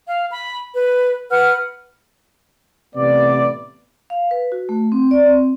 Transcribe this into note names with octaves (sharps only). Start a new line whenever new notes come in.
F5
B5
B4
B4 F#5 F6 F#6
A1 C3 A3 B3 D5
F5
B4
F#4
A3
C4
D5
C4